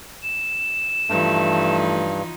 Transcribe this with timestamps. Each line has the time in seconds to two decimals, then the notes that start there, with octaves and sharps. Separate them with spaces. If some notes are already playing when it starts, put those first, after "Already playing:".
0.23 E7
1.10 G2 E3 F3 A3 D#4